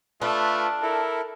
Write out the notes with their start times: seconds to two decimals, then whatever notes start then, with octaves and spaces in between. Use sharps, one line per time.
0.22 A3 D4 F4 B4
0.82 E4 A4 A#4